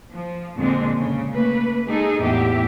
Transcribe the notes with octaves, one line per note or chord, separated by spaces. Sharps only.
F3
F2 A#2 D3 G#3 C4 D4
C#3
A3 A#3 B4
G#3 D#4 G#4 A4
E2 A2 G4 E5